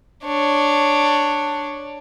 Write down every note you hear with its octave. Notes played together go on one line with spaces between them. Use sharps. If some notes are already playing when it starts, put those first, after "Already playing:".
D4 C#5